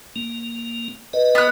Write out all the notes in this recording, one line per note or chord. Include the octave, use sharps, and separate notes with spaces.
A#3
B4 D#5
B3 F#6